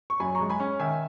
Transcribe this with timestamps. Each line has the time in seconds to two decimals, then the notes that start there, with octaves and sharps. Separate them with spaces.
0.10 C#6
0.20 F#2 G#5 B5
0.35 A#5 C#6
0.40 G#3
0.50 G#5 B5
0.60 C#4
0.80 D#3 E5 G#5